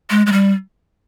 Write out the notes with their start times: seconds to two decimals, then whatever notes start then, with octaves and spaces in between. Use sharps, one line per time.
0.10 G#3
0.26 G#3
0.32 G3